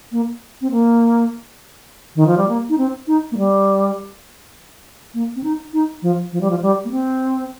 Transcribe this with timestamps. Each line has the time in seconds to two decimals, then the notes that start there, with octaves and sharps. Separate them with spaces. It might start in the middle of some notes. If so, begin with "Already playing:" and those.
0.12 A#3
0.62 C4
0.71 A#3
2.16 D#3
2.27 F3
2.38 G3
2.49 A#3
2.69 D#4
2.78 C4
3.07 D#4
3.32 A#3
3.38 G3
5.14 A#3
5.36 C4
5.44 D#4
5.73 D#4
6.02 F3
6.32 F3
6.41 G3
6.50 F3
6.62 G3
6.85 A#3
6.91 C4